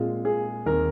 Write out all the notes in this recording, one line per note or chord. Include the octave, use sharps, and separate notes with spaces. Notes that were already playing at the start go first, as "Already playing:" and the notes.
Already playing: A#2 G#3 C4 F4
G#4
D#2 D#3 C4 A#4